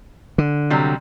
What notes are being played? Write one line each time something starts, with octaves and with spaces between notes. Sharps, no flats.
D3
C3 F#3 G3